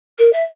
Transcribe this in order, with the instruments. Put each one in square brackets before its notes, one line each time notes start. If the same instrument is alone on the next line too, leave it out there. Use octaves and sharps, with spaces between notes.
[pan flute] A#4
E5